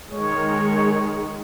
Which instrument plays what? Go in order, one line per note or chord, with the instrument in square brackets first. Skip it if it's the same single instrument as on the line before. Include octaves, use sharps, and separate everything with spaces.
[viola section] D#3 G#3 [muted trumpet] C#5